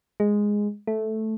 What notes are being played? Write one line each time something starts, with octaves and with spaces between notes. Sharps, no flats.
G#3
A3